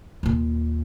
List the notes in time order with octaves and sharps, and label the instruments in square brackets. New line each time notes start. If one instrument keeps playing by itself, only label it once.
[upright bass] D#2 A#2